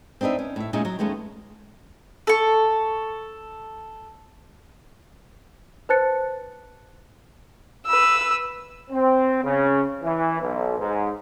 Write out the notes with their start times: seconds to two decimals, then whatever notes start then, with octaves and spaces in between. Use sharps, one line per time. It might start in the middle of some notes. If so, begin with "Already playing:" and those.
0.21 C4 D4 D#4 B4 E5
0.39 C#4
0.56 A2 E5
0.73 A#2 G#3 C#4 D#4 E4 G#4
0.85 F#3
0.99 D#2 G#3 A3 B3 C#4
2.27 A4 C#6
5.89 B4 C5 A5 F#6 A6 C#7
7.87 B4 E6
8.90 C4
9.42 C#3
10.03 E3
10.41 B1
10.79 G#2